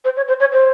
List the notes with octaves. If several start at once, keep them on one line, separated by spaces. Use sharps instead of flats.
C5
C#5
C5
C#5
C5